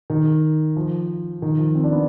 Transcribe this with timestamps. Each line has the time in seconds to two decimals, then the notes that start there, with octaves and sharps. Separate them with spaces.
0.10 D#3
0.76 F3
1.42 D#3
1.59 F3
1.75 C4
1.84 D4
1.92 B3